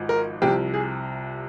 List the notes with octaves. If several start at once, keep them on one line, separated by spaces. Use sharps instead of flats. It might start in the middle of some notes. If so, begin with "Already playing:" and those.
Already playing: G#1 G#2 F3
A#4
C2 C3 F3 G4
G#4